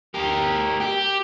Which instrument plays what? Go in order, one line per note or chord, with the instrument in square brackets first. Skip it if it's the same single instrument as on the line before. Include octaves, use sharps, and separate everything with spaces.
[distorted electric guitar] G4 A#4
G4